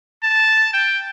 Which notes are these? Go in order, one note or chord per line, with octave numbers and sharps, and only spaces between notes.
A5
G5